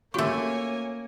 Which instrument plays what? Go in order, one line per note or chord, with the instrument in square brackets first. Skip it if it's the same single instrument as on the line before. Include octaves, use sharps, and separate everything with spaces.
[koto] A3 G4 [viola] A#3 [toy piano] C#4 F#4 C#6 [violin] C#5 G#5